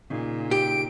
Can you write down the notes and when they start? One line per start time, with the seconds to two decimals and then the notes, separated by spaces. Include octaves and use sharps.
0.10 A#2 C#3 D#4 G#4
0.51 G4 D7